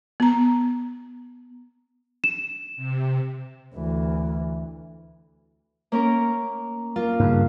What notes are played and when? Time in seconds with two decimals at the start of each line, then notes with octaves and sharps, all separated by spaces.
0.20 B3 A#5
2.24 E7
2.76 C3
3.75 D2 E3
5.92 A#3 C#4 A#4
6.96 A#3 F4
7.20 G2 C#3